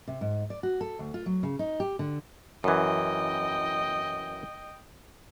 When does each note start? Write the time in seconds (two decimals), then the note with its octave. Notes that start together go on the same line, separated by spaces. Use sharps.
0.08 C3
0.21 G#2
0.50 D5
0.63 F#4
0.81 A4
0.99 D2
1.14 F4
1.26 F#3
1.43 C#3
1.59 D#4
1.80 G4
1.99 D3
2.64 F#2 E3 D#5 G5